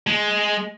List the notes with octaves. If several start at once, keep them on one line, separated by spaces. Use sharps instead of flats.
G#3